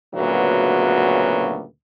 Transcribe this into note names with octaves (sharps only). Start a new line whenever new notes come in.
D2 A#2 C#3 F#3 B3 B4